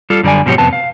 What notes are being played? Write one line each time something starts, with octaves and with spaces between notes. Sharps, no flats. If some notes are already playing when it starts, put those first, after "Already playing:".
G3 F4 A4
F#2 D3 G3 D5 G#5
G#2 B2 F3 F#3 G4 C#5
F2 C3 B3 A5
F5